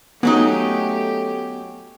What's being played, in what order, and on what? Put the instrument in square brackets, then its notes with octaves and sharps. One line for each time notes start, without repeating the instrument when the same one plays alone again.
[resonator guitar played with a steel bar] F#3 C#4 D#4 [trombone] A3 [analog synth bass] B3 [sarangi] G4